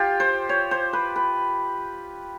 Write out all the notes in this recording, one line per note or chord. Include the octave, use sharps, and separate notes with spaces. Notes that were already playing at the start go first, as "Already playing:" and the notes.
Already playing: F4 G4
C5
C#5
C5
B4
B4